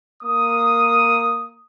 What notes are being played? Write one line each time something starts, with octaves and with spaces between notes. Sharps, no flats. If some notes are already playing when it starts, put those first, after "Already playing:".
A#3 D#6